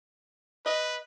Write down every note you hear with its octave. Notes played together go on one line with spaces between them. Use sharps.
B4 D#5